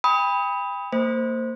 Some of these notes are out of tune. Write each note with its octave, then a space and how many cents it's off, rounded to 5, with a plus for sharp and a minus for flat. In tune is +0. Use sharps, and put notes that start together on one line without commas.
G5 +40 B5 +0 D#6 +25
A#3 -30 C5 +0